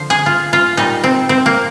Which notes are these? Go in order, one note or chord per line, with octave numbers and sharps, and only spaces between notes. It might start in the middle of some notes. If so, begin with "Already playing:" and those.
Already playing: D3 F3 C5
G#4
F4
F4
A#2 G3 D#4
C4
C4
A#3